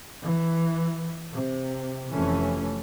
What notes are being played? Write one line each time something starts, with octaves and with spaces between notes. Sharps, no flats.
E3
C3
F1 E3 A3 C#4